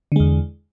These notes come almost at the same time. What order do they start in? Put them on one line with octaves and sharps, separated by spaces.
D3 G#3 E2